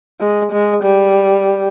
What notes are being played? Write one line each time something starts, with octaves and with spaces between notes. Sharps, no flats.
G#3
G#3
G3